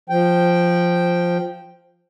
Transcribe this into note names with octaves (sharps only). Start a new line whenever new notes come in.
F3 G5